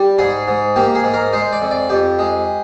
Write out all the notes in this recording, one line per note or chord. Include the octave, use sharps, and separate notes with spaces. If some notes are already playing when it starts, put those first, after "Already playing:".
Already playing: G3
G#2 G#4
G#2
A#3 G4
G#4
G#2
A#4
G#3 C5
D5
F2
D5
F2 G4
G#3